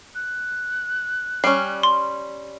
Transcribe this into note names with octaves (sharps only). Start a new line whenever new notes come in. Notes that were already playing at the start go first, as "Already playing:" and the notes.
F#6
G3 C#4 C7
C6